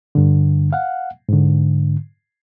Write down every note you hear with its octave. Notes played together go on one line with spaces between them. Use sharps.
G2 D3
F5 F#5
G#2 D3